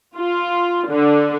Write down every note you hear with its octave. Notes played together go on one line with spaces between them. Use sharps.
F4
D3